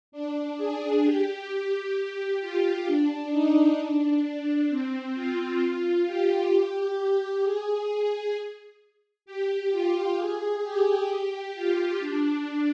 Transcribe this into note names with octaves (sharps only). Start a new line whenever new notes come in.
D4
G#4
G4
G4
G4
F4
D4
D#4
D4
C4
F4
G4
G#4
G4
F4
G#4
G4
G4
F4
D4